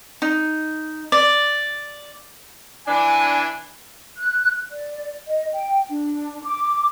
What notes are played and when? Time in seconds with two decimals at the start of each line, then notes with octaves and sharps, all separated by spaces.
0.22 D#4
1.12 D5
2.88 E3 D4 G#5
4.18 F#6
4.73 D5
5.27 D#5
5.54 G5
5.89 D4
6.43 D6